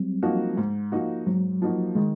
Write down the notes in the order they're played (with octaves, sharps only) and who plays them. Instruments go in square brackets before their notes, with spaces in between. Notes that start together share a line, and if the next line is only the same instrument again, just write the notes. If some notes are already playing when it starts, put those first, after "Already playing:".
Already playing: [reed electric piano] F#3 G3 C4
[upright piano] F3 A#3 D#4 F#4
G#2
F3 A#3 D#4 F#4
[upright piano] G#2 [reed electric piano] F#3
[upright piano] F3 A#3 D#4 F#4
[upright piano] D#3 [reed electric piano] G#3